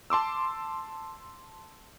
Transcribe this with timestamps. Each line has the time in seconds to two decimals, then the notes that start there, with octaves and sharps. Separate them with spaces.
0.10 A5 C6 D6 E6